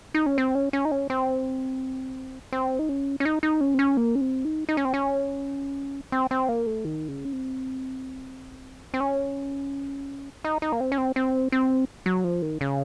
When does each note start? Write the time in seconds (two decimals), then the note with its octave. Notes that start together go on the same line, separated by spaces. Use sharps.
0.14 D#4
0.26 C#4
0.38 C4
0.55 C#4
0.73 C#4
0.85 D#4
0.91 C#4
1.10 C4
2.53 C4
2.79 D#4
2.89 C#4
3.20 C#4
3.25 D#4
3.43 D#4
3.61 C#4
3.74 C4
3.79 C#4
3.97 A#3
4.15 C#4
4.21 C4
4.45 D#4
4.69 D#4
4.77 C#4
4.85 C4
4.94 C#4
6.12 C4
6.31 C4
6.49 A#3
6.67 A3
6.85 D#3
7.08 C#3
7.25 C#4
7.33 C4
8.94 C4
9.00 C#4
10.44 D#4
10.62 D#4
10.72 A#3
10.81 C4
10.92 C#4
10.98 C4
11.16 C4
11.52 C4
12.06 F#3
12.24 F3
12.42 D#3
12.61 C#3